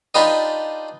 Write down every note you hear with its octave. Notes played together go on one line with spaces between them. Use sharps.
D4 D#4 F4 G4 B4 D#5